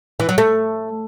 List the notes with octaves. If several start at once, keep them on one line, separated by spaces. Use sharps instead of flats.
E3
F#3
A3